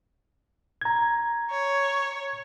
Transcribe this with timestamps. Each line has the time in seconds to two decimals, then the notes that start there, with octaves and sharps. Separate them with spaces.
0.81 A#5 G#6
1.51 C#5